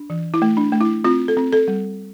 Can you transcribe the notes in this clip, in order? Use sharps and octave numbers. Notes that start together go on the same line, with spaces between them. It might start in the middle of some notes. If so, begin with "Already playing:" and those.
Already playing: D4
E3
E4
A3
D4
A3
E4
C4 F4
A4
C4
A4
G3